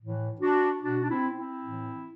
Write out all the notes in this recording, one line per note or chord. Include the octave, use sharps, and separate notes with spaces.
A2 E3
D4 F#4
B2 D4 F#4
D4
C4 E4
C4 E4
A2 E3